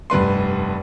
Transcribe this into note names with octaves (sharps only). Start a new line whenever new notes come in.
F1 G2 B4 C6